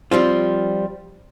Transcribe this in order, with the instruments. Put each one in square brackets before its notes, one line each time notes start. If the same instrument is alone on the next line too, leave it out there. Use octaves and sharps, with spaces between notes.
[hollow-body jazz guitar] F3 G3 C4 F4